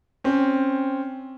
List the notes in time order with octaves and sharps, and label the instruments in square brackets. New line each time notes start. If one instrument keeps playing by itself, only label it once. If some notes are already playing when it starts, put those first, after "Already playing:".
[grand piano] C4 C#4